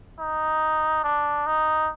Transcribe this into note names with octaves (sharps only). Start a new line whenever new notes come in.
D#4
D4
D#4